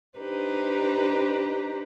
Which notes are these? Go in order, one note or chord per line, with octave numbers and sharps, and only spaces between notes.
D4 D#4 G4 B4 C5 A#5